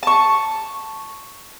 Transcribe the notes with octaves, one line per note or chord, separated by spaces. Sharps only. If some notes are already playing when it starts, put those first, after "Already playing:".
A5 C#6